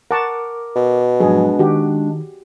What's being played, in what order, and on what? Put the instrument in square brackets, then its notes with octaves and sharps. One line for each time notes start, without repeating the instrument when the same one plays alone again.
[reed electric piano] A#4 D6 [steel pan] F#5 A5 C#6
[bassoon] B2
[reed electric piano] G#2 F3 F#3 [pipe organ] G#3 D4 [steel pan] G#4
[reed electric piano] D#3 [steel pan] F#4 G4